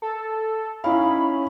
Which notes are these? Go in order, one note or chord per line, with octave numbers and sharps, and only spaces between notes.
A4
C#4 D#4 E4 F5 B5